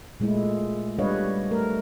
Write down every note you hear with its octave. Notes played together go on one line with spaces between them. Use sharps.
A#2 G#3 A3 E4
G3 D4 B4 C#5 D#5 F5
A3 A#4